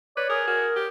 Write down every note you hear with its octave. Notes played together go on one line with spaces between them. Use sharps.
B4 C#5 D5
G#4 A#4
F#4 A#4
G4